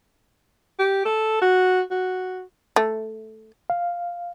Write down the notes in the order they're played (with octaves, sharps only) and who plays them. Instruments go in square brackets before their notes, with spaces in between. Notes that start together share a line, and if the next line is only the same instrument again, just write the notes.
[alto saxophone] G4
A4
F#4
F#4
[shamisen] A3
[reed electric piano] F5